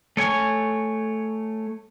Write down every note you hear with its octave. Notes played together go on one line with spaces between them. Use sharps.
A3 C#5 G#5